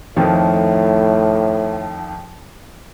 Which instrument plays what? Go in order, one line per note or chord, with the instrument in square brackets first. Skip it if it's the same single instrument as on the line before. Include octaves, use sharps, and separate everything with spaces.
[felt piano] F2 D#3 F3 [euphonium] A2